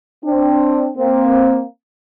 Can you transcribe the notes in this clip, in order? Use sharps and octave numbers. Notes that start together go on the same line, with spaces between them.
C4 D4
A#3 C4